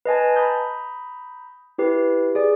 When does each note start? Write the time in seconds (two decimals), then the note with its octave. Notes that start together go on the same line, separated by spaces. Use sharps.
0.06 B4 D#5 G#5 A5
0.36 A#5 B5 D#6 G6
1.78 E4 G4 B4
2.35 G#4 D5